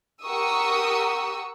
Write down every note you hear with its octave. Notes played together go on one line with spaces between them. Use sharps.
G4 A#4 F#5 C#6 D#6 E6